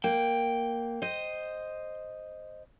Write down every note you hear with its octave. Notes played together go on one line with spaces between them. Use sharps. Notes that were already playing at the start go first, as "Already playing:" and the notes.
A#3 G5
C5 D#5